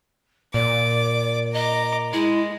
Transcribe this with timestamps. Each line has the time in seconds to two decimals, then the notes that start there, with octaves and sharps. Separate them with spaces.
0.54 A#2 D5 D6
1.54 D#5 A#5 D6
2.13 G#3 E4